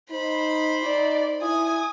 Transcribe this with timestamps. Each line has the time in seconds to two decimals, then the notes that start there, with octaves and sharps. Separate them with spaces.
0.11 D#4 C5 B5
0.83 D#4 D5
1.42 E4 G#5 D#6